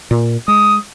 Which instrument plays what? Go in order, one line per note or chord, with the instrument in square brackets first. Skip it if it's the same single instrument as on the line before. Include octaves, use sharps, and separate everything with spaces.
[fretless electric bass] A#2
[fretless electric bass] G#3 [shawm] D#6